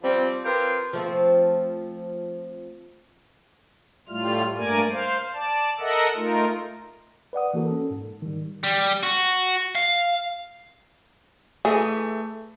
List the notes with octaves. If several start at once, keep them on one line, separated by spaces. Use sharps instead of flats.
F3 G3 C4
C4 F4 G4 A#4 B4
F3 A3 C4
A2 G3 A3 F4 F6
G2 A3 A#3 A#4 D5 G#5
C5 F5
D5 A5
A4 A#4 D#5 E5 F#5
A3 D#4 F4 A#4
B4 D5 F#5 D#6
E3 A#3 F#4 A4 A#4
C#4 A4
G#2
D#3 G3
G3
F#4
F5
E3 A3 G#4 D#5 E5